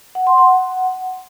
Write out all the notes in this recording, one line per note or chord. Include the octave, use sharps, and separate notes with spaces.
F#5
C6
F#5